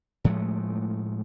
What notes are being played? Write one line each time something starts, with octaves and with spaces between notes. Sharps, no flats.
A2 F3 G#3 A3